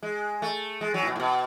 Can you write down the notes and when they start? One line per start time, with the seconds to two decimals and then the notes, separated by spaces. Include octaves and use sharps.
0.03 G#3
0.42 A3
0.81 G#3
0.94 F#3
1.02 A2
1.07 B2
1.16 A2
1.20 B2